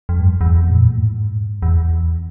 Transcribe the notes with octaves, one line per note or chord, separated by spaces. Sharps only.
F2
G2
E2
F2
A#2
A2
G#2
E2